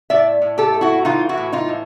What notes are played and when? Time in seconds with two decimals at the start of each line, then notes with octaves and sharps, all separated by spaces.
0.10 A2 D5 E5
0.42 A2
0.58 G4 A4
0.74 A3
0.81 E4 F#4
1.05 E3 D#4 F4
1.29 E4 F#4
1.38 A2
1.53 D#4 F4
1.68 A2